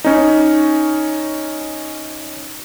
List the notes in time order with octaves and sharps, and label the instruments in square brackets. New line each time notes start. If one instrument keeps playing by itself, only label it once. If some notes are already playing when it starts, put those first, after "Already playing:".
[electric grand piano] C#4 D#4